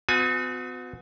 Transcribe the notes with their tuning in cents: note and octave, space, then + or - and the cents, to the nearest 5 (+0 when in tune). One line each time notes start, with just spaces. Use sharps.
B3 +40 F#4 -35 G#5 +10